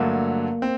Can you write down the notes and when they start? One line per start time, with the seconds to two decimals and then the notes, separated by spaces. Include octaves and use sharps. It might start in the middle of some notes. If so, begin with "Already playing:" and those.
Already playing: G2 D3 F#3 A3 A#3
0.62 C4